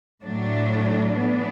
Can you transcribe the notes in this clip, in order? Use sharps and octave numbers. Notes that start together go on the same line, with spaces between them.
A2 F#3 A3 D4
E3 B3 D4